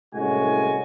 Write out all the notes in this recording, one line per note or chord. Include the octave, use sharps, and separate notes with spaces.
C2 A2 G#3 C#4 F#4 G#5